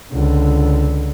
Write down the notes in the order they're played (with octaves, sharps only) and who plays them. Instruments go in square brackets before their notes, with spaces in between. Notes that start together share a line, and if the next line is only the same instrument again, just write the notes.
[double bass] C#2 D3